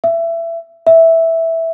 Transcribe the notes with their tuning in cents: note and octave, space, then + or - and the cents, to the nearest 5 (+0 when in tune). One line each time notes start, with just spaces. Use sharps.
E5 +20
E5 -5